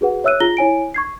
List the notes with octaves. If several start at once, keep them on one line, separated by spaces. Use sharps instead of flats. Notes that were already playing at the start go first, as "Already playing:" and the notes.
F#4 G#4 B4 F#5
C#5 E5 E6 F#6 D#7
F4 G#4 A#5 A#6 G7
E4 C#5 G#5 D7
C#6 G#6 C7